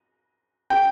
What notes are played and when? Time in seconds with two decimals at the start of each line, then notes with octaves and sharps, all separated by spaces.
0.70 G5